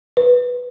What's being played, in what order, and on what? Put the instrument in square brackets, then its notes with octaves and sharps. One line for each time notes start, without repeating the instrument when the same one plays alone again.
[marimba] B4